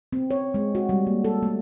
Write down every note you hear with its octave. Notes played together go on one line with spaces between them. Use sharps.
C4
C#5
G#3
F#4
G3
A#3
A4
A3